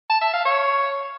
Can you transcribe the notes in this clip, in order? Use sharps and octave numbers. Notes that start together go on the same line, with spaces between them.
A5
E5
F5
C#5